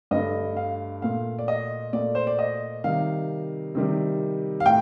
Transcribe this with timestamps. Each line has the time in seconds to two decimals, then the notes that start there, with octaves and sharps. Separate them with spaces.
0.11 G2 D3 A3 D#5
0.57 F5
1.02 A#2 A3 F5
1.39 D5
1.48 D#5
1.93 A#2 A3 D5
2.15 C5
2.27 D5
2.39 D#5
2.84 C3 D#3 G3 F5
3.75 C3 D#3 G3
4.60 F5
4.66 A2 G5